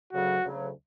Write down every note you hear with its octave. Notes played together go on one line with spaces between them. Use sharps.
D2 C#3 F#3 F#4
D2 C#3 F#3